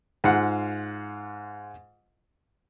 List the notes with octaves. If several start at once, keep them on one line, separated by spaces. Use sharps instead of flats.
G#2 F4 F5 F#5